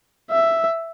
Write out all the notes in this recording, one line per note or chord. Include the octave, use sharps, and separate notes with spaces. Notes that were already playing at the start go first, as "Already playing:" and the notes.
E5